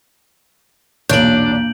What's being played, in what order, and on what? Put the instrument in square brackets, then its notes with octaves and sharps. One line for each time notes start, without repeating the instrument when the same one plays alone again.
[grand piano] B1 E2 C#5 [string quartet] A#2 [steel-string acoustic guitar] D4 [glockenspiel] G6 D7 F#7